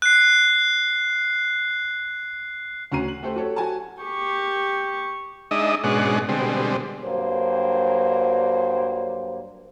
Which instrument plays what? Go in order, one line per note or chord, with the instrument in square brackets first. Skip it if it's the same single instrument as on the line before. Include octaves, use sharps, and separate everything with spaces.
[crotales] F#6 C7
[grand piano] D2 C#4 F#4 A#5 C7 D#7
F#7
A3 G4 A4 C5
F#4 G4 A4 C#5
F#4 G#5 A5
[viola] G4 C#6
[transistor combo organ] G#3 D4 D#4 D#5 E5
G#2 B2 G#3 C#4 D4 F#5
B2 D3 G3 G#3 C4
[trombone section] G2 F#3 A#3 C5